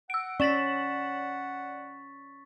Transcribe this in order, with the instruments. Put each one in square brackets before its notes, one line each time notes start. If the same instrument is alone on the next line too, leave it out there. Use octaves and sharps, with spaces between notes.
[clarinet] F#5 [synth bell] E6 D7
[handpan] C#4 [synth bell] D5 E7 F#7 [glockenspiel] C#6 A6 B6